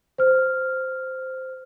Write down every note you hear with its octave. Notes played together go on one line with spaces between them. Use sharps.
C5 F6